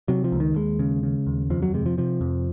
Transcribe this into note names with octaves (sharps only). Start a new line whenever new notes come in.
C3 F#3
F3
C#2
D#3
D#2 G#3
C#3
C#3
D#2
F2 F3
F#3
C3 G#3
F3
C3 F3
F2